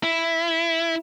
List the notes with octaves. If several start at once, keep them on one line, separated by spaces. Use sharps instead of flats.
E4